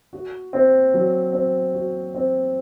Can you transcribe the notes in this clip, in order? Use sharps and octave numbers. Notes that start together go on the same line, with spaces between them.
F#4
C4
F#3
C4
F#4
C4